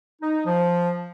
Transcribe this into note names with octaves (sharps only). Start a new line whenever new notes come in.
D#4
F3